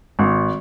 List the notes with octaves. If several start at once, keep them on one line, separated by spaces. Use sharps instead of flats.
G#1